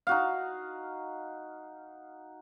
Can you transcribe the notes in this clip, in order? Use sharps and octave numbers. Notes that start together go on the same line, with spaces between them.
D#4 F#4 F5